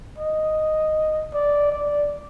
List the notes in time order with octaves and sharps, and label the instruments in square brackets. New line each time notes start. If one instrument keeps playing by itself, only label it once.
[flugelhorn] D#5
D5
D5